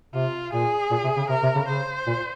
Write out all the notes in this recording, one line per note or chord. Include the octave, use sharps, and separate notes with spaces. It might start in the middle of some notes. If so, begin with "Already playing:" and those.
C3 F4
A#2 G#4
A#2
C3
C#3
C3 A#4
C3
C#3
C#3 C5
A#2